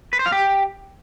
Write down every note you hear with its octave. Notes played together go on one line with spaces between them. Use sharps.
B4
C5
F5
G4